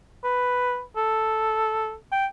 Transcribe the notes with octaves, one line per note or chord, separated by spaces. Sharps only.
B4
A4
G5